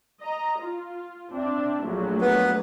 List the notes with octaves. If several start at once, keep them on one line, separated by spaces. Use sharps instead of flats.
D#5 A#5
F4
C4 D4 E5
A#1 F#3 A3
B3 B4